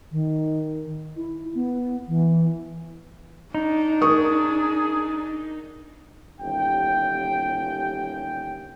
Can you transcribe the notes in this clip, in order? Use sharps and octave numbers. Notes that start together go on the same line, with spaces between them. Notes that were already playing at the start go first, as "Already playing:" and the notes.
D#3
E4
B3
E3
D4 D#4
G#4 A#4 C#6 D#6
G1 D#2 C#4 G4 G5